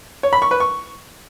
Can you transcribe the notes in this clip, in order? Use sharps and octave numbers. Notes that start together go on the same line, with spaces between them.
C#5
B5
C#6
B4
C#6